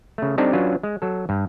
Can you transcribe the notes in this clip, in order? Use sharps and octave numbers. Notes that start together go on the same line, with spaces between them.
C#3 A3
G3 C4 D4 D#4 G4 A4
F#3 C#4 D4 F4 B4
G#3
F#3 A4
G2